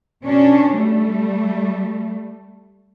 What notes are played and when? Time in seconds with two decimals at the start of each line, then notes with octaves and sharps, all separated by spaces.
0.24 B2 C#4 D4
0.75 G3 A3